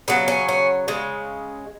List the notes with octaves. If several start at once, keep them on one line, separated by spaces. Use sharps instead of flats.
C#3 F#3 B3
C#4
C#4
C#3 G#3